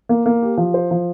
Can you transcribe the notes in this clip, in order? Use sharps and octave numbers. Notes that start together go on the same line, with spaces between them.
A#3
A#3
G4
F3
C5
F3